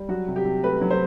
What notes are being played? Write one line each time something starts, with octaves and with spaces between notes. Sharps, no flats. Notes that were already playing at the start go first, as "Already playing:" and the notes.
Already playing: G3
F#3 F#4
C3
G4
C3
A3 B4
F#3
C5